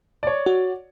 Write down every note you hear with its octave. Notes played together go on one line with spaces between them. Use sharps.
C#5 D5
F#4